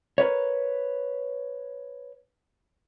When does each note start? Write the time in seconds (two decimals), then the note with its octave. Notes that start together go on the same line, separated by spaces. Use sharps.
0.18 A#4 B4 C#5